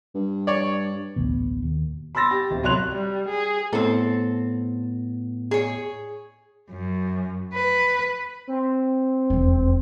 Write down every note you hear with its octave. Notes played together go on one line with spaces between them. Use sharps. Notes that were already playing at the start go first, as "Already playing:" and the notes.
G2
C#5 D5
A1 D2 B2
D#2
B5 C6 E6 A6 A#6
G4
D1
C2 F#3 C#5 C6 F#6 F7
G3
G#4
A2 B3 C4 A4
G#4 C#5
F#2
B4
C4
E1 F2